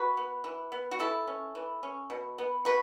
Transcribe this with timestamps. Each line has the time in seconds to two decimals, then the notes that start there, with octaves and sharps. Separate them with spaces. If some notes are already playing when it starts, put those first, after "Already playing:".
Already playing: F#4 B4
0.17 B3
0.44 E3
0.72 B3
0.91 F#4
0.99 E3 E4 A4
1.28 C#4
1.55 E3
1.83 C#4
2.10 B2
2.38 B3
2.65 B2 F#4 B4